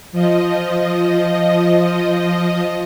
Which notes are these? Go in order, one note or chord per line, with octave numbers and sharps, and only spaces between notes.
F3 D#5